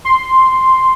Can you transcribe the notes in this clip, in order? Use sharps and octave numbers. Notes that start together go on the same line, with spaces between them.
C6